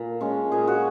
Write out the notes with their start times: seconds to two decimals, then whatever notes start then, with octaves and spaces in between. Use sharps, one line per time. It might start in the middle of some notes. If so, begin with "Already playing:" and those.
Already playing: A#2
0.21 G#3 C#4
0.52 A#2 G#4
0.67 F#4